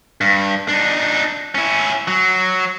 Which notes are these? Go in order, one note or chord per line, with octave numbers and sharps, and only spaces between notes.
G2
D4 D#4
C#4 E4
F#3